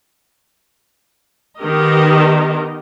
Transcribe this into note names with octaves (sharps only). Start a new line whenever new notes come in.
D#3 B3 D#4 G4 A#4 D#5